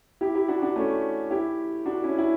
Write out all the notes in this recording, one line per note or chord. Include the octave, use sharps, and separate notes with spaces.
E4 G4
E4 G4
D4 F#4
D4 F#4
A3 C#4
E4 G4
D4 F#4
C#4 E4
E4